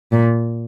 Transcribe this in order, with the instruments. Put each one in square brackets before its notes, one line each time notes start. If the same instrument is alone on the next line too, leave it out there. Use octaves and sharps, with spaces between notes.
[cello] A#2